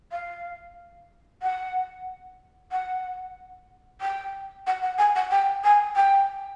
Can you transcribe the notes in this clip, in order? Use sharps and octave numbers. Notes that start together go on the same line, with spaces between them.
F5
F#5
F#5
G5
F#5
F#5
G#5
F#5
G5
G#5
G5